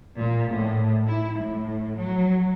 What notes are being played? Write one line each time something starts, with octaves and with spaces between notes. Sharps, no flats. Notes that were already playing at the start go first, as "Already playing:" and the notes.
A#2
A2
E4
A2
F#3